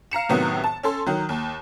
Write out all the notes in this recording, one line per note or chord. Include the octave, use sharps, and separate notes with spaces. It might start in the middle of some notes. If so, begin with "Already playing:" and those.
F5 A#5 C#7 E7
A2 C3 D#3 F#3 B3
A5
C#4 A4 C6
D#3 F#3
D#2